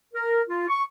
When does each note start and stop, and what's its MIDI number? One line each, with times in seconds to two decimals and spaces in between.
0.14 0.41 70
0.48 0.65 65
0.68 0.80 85